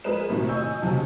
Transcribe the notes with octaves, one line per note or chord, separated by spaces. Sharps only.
F3 G#3 G#4 A#4 B4 E7
A2 C3 D#3 F3 F#4
D#5 G#5 C#6 E6 G6
D#2 C#3 F3 F#4 A5